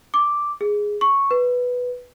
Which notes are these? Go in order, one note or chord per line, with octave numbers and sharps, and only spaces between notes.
D6
G#4
C#6
B4